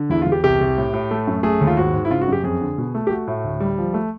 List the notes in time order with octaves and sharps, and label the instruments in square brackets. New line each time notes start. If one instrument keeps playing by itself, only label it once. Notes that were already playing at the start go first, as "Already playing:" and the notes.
Already playing: [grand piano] D3
E2 E4
F4
E2
G4
C2 G4
C2
A2
A2
A3
F#2
A3 G#4
D#2
F4
G#2 F#4
G#2
E4
C#3 F4
F#4
F#2 G4
F2 G#4
D3
B2
A3
G4
A3 F#4
A2
D2
G3
F3
A3